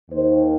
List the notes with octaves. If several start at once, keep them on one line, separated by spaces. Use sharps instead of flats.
D#2 D#3 C5